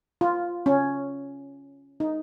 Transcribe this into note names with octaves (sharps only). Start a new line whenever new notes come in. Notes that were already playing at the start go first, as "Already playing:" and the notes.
F4
C#4
D#4